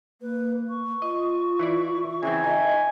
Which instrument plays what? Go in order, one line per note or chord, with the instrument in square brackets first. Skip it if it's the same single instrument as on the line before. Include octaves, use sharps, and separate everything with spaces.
[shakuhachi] A#3 [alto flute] B4
[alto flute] C#6
[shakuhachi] F4 [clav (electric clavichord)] D#5
[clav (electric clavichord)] E3 E4 D5
[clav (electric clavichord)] C#3 E3 C4 [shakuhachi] E5 [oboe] G#5
[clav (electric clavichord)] D#4 [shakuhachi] D#5 [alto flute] E5